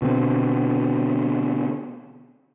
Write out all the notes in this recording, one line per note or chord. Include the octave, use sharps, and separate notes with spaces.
B2 D3 C4